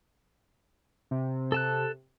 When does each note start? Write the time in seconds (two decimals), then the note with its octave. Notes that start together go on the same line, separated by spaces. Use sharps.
1.11 C3
1.52 A4 A5 F#6